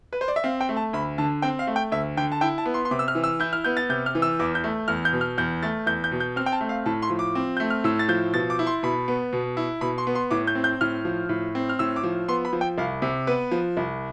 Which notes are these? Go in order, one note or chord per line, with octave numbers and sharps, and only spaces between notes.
B4
C5
D5
E5
C4 F5
G5
A3
A5
D2 B5
D3 A5
C4 G5
F5
A3
G5
D2 E5
D3 G5
A5
E4 G5
A5
B3
C6
C6
C3 D6
E6
F6
E3
E6
E4 G6
F6
B3 G6
A6
C3 G6
F6
E3
E6
E2 D6
G6
A3
E2 F6
G6
B2
F6
E2 G6
A3 A6
E2 G6
G6
B2
G6
C4 F6
G5
A5
A3
F5
A2 A5
C6
F3
D6
C4
A3 G6
F6
A2 E6
A6
F3 G6
B2 A6
D6
E4
C6
B2 B5
B3
B2
E4
B2 B5
C6
B3
C6
A2 D6
G6
C4
G6
A2 F6
F3
A2
C4
F6
A2 E6
D6
F3
B3 C6
B5
F3
G5
C2 F5
C3
B3 B4
F3
C2